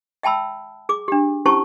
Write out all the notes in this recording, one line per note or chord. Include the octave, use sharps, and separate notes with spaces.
E5 G5 A5 B5 E6
G#4 D6
D4 G4
C#4 E4 G4 C5 A5 C#6